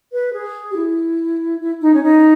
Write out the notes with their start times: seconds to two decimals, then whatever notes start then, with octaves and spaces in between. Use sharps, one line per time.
0.12 B4
0.34 G#4
0.71 G4
0.76 E4
1.60 E4
1.82 D#4
1.92 C#4
2.02 D#4